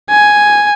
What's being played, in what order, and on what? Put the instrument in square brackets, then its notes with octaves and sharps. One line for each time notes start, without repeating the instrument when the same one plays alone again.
[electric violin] G#5